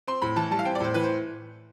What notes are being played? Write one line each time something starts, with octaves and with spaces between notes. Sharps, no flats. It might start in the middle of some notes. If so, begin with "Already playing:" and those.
C4 C6
A2 B5
E3 A5
G3 A5
F5
C4 G5
D5
A2 C5
E3 B4
C5